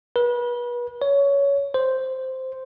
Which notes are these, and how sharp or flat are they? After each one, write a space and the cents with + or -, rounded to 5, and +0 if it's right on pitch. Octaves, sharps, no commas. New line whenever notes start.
B4 -35
C#5 +15
C5 -5